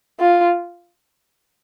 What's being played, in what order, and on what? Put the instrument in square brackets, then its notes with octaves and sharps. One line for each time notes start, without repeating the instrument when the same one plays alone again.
[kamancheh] F4